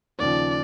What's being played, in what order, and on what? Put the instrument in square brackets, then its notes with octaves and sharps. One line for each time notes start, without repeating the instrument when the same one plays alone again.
[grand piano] D#2 C#3 F3 [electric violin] D5